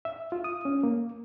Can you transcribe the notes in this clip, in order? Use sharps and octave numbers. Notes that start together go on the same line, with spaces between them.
E5
F4
D#6
C#4
A#3